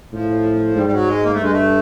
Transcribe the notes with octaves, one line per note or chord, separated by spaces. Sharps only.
A2 F3
G#2 G3
G3
F#3
G#3
A#3
A3
G2 G#3
A3